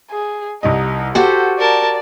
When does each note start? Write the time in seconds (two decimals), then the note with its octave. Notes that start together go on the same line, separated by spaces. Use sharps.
0.11 G#4
0.63 C2 G3 D#4 D#5
1.15 F#4 G4 A4 C5 F#5
1.59 A#4 D5 A5